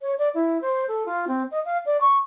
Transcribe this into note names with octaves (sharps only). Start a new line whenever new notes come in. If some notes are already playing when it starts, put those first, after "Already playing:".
C#5
D5
E4
C5
A4
F4
C4
D#5
F5
D5
C#6